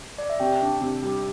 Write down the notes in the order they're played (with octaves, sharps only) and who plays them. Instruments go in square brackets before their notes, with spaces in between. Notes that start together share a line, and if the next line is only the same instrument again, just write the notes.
[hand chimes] D5
E5
[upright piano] C3 [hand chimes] G4 G5
[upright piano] D4
C3
G3